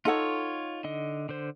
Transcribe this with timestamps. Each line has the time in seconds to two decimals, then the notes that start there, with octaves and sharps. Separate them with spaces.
0.05 D#4 F4 A4 C#5 F#5
0.84 D3 D#5
1.29 D3 C5